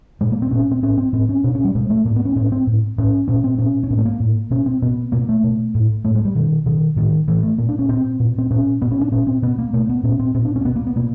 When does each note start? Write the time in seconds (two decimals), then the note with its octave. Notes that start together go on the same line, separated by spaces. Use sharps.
0.21 A#2 G#3
0.32 A#3
0.42 C4
0.51 A#2 C#4
0.71 C4
0.82 A2 C#4
0.98 C4
1.13 A2 C4
1.29 C#4
1.44 B2 D4
1.55 C#4
1.65 G3
1.75 B2 G#3
1.90 A3
2.05 A2 A#3
2.16 B3
2.25 C#4
2.36 A2 C#4
2.46 C#4
2.52 C4
2.67 A2
2.98 A2 C#4
3.28 A#2 C#4
3.44 C4
3.58 A#2 C#4
3.84 C#4
3.90 A2 C4
3.98 A3
4.05 A#3
4.20 A2
4.51 B2 C#4
4.66 C4
4.82 B2 B3
5.12 B2 A#3
5.29 A3
5.44 B2
5.75 A2
6.05 A2 A3
6.15 G#3
6.25 G3
6.35 B2 D#3
6.66 B2 D#3
6.96 A2 D#3
7.28 A2 E3
7.43 A3
7.58 A#2 A#3
7.69 D4
7.79 C#4
7.89 A#2 C4
8.20 A#2
8.38 C4
8.51 A#2 C#4
8.82 A#2 B3
8.92 C#4
9.01 D4
9.12 A#2 C#4
9.27 C4
9.42 B2 B3
9.58 A#3
9.73 B2 A3
9.89 B3
10.03 A#2 C#4
10.20 C4
10.34 A#2 C4
10.45 D4
10.56 C#4
10.61 C4
10.65 B2 B3
10.76 A#3
10.87 B3
10.96 B2 A#3